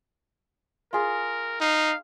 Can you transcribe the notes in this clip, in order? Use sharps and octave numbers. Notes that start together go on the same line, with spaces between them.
F4 G#4 A#4
D#4 F5